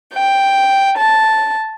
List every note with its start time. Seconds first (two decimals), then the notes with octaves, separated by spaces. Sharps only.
0.12 G5
0.95 A5